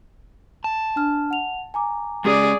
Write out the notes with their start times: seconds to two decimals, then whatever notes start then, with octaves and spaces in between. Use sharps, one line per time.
0.64 A5
0.96 D4 F6
1.30 F#5 F7
1.74 G#5 A#5 D6
2.25 G#3 C#4 G#4 D5